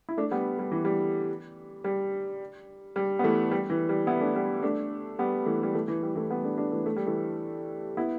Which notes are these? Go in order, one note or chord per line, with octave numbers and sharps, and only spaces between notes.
E4
A3 D4
G3 B3
G3
E3
G3
G3
G3
B3
E3 A3
G3
E3
G3
B3 E4
A3 D4
G3 B3
A3 D4
G3 B3
E3 A3
G3
E3 A3
E3
G3
E3 A3
G3 B3
A3 D4
A3 D4
E3 A3
A3
G3
E3 A3
B3 E4